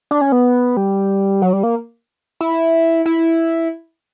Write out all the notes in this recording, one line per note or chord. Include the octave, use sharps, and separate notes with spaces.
D4
C#4
B3
G3
F#3
G3
A#3
E4
E4